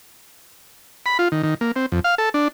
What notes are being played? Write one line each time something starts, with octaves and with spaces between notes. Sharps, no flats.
B5
F4
D#3
D#3
A#3
C4
F2
F5
A4
D4